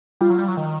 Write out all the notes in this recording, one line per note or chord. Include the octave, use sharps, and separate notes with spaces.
G3 F4
F#3
G3
F#3
D#3